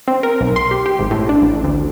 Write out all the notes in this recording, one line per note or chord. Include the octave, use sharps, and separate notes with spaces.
C4
A#4
B1
C6
G4
G4
G#1
A2
D4
A1
D2